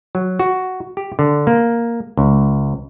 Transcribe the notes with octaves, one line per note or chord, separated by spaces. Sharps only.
F#3
F#4
G4
D3
A#3
C#2